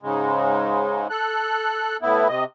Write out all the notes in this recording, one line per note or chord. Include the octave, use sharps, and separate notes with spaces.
G#2 C#3 G#3
A4 F#6
A2 B3 E4
C3 D#5